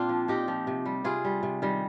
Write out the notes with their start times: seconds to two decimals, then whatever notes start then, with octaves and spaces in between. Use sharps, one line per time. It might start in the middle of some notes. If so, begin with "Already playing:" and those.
Already playing: A#2 A#3 C4 D4 F4
0.09 F3
0.28 A#2 D#4 G4
0.48 F3
0.67 C3
0.86 G3
1.04 C3 F4 G#4
1.25 G3
1.43 C3
1.62 D#3 G3